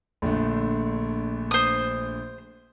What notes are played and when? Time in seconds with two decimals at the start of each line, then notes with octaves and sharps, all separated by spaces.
0.22 A#1 D3 A3
1.51 C5 D#6